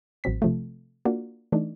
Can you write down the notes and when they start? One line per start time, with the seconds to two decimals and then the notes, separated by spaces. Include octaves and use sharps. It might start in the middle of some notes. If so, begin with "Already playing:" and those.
0.24 A1 F#3 C4 B6
0.42 C3 F3 A3
1.05 A#3 D4 F4 F#4
1.52 E3 A3 D4 D#4